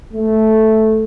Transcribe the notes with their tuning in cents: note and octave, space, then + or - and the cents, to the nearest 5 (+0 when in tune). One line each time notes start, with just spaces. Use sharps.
A3 -5